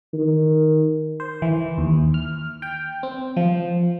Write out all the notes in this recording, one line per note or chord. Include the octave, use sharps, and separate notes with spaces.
D#3
C5
E3
D#2
F6
G5
C4
F3